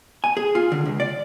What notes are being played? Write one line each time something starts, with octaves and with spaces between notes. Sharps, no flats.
G#5
G#4
F4
D3
C#2
D5